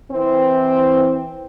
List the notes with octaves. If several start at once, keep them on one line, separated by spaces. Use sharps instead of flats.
E3 C4